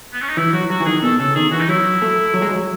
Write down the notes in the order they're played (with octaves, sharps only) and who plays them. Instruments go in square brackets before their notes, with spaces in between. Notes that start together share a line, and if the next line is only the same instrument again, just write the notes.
[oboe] B3
C#4
D#4
[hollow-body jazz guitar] E3 [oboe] E4
[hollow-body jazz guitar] F#3 [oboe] F#4
[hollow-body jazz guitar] F#3 [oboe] F#4
[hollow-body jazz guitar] E3
[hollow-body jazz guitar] D#3 [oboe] G#4
[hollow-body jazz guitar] B2 [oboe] A4
[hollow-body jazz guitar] C#3 [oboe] A4
[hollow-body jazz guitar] D#3 [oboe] G#4
[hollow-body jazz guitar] E3 [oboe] F#4
[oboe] D#4
[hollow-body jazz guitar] F#3 [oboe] E4
[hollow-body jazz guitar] A3
F#3
G#3
F#3